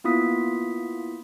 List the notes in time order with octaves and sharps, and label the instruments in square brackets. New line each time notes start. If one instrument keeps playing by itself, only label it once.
[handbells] A#3 B3 E4 F4 D#6 B6